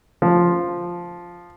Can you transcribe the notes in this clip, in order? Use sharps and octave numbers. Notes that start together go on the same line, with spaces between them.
F3